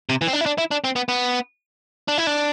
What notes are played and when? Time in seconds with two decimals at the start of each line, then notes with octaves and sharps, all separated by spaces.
0.09 C3
0.21 E3
0.27 C4
0.33 D4
0.41 E4
0.46 D4
0.58 E4
0.71 D4
0.84 C4
0.96 B3
1.08 B3
2.08 D4
2.18 E4
2.27 D4